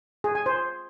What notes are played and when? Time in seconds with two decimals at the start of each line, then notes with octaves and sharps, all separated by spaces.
0.24 G#4
0.35 G#5
0.46 C5